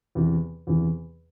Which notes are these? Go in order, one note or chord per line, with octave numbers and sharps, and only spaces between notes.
E2 C3 E3
E2 C3 E3